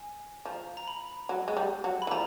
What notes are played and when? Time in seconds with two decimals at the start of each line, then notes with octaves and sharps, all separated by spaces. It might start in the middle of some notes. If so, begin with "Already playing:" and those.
Already playing: G#5
0.45 F3 A#5
0.77 A#5
0.88 B5
1.29 F#3
1.48 G#3
1.57 G3
1.84 F#3
2.02 B5
2.07 E3
2.11 F3 A#5